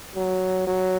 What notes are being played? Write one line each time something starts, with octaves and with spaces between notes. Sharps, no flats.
F#3
F#3